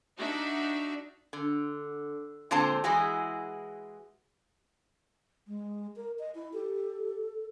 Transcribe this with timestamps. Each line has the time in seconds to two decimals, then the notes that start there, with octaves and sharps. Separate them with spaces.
0.17 D4 D#4 F#4 E5
1.33 D3
2.51 A#2 D3 G#3 C4 C5 A5
2.84 E3 G#3 E4 F#4 G#4
5.47 G#3
5.96 A#4
6.19 D#5
6.35 E4
6.53 G4 A4